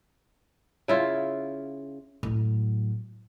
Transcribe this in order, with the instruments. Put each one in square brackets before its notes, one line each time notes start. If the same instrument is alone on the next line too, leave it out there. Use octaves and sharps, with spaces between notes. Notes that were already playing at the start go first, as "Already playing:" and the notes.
[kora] C#3 E4 F4
[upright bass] A2 F#3